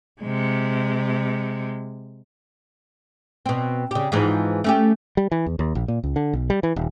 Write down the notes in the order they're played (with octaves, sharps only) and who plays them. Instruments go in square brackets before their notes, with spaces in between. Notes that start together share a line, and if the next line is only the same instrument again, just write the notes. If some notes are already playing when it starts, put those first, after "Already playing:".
[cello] C3 G#3
[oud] B2 C4
C#3 G4
G#2 E3 F3
A3 C#4 G4
[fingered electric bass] G3
E3
E2
D#2
A#1
A#2
C#2
D3
B1
G3
E3
D#1